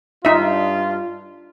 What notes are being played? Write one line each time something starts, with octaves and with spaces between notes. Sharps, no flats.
G2 D4 D#4 F4 E5